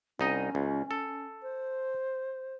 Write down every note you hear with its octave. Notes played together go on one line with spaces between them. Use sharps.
C2 C#4 D#4 D#5
C#2
A4
C5